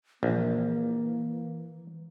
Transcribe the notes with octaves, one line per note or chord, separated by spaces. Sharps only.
A#1 E3 A#3